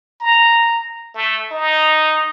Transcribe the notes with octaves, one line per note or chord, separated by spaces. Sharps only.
A#5
A3
D#4